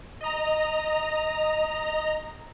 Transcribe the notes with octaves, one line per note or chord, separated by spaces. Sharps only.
D#5 A#5